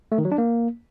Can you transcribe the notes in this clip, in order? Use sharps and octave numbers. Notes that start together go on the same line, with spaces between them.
A3
D#3
F#3
D4
A#3